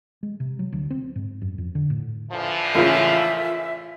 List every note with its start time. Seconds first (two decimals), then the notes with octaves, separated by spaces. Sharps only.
0.23 G#3
0.40 C3
0.59 F#3
0.72 D2
0.90 C4
1.16 G#2
1.42 F#2
1.58 F2
1.75 D3
1.90 A2
2.31 D3 E3 F3
2.75 A1 C#3 F4 A#4 E5